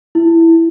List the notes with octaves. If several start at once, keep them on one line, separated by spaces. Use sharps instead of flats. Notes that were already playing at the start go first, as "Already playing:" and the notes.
E4